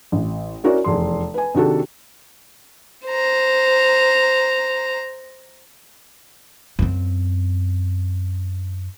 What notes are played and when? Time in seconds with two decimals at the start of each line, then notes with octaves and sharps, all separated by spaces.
0.12 A1
0.64 C#4 E4 F#4 A#4 D5
0.84 F1 E2 C6
1.34 B4 G#5
1.55 C3 D#3 D4 F#4 G#4 A4
3.07 C5 A#5
6.79 F#2 C4